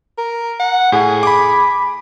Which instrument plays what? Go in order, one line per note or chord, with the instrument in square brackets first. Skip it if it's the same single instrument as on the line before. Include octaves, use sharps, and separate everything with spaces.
[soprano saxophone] A#4
F#5
[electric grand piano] A2 G#5 [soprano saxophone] G#4
[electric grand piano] B5 D6